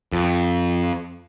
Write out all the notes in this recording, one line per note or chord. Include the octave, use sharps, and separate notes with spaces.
F2